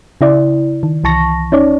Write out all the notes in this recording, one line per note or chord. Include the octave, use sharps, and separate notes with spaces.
C#3 E4 D5
D#3
C2 E3 A5 C#6 A#6
C#4 D#4 C#5 D5